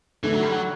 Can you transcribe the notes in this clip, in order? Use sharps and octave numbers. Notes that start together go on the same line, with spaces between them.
D3 E3 A3 D4 A4
F#3
G3
F#3